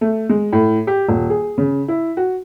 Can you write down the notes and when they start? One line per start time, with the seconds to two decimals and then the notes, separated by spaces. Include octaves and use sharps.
0.01 A3
0.30 G#3
0.53 A2
0.87 G4
1.09 D#1
1.30 G#4
1.58 C#3
1.88 E4
2.17 F#4